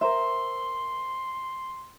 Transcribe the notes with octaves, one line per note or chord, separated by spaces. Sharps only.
A#4 C5 E5 C6